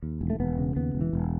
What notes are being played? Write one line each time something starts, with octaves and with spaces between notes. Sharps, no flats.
D#2
E1
A3
E1 B3
C#3
D#2 B3
E1
E3
E1